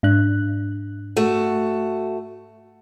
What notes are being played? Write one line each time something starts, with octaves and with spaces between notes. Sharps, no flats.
G#2 D4 F#6
A3 F#4